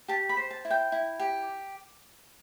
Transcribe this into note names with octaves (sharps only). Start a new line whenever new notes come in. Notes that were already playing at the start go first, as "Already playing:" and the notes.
G4 A5
B5
C5
A5
E4
G5
E4
G4